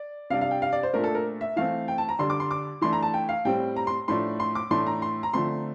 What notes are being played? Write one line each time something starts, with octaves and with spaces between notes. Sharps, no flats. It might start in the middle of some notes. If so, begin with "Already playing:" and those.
Already playing: D5
C3 G3 D4 F5
F5
G5
F5
D5
C5
A#2 A3 D4 A#4
A4
A#4
E5
E3 A3 C4 F5
G5
A5
A#5
D3 G3 D4 C6
D6
C6
D6
E3 A3 D4 C6
A#5
A5
G5
F5
A2 G3 C4 G5
A#5
C6
A2 F3 A3 D4 C6
C6
D6
A2 E3 A3 D4 C6
A#5
C6
A#5
D3 F3 A3 C4 C6